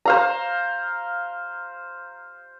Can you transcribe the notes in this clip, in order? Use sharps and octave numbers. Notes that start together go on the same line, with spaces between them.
C5 F5 A#5